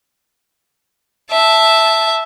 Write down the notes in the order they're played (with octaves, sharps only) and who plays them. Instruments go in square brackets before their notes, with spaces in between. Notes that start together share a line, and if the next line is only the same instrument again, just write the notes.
[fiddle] E5 A5